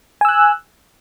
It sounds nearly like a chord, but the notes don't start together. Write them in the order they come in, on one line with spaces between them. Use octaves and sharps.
G#5 E6 F#6